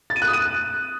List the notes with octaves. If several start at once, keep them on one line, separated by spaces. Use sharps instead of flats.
A6
D#7
F#6
D#6
D#7